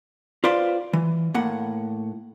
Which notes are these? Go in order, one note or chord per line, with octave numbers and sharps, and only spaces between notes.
F4 B4 C5 D5 F5
E3
A2 A#3 F#5